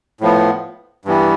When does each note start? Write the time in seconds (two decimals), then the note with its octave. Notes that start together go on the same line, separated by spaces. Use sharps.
0.21 A2 F3 B3
1.05 G2 E3 G3 B3